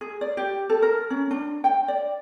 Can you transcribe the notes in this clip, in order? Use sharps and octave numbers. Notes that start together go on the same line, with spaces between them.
G#4
D5
G4
A4
A#4
C#4
D4
G5
D5